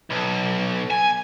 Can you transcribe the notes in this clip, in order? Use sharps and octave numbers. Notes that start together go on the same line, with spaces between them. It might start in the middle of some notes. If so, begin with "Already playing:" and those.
B1
G#5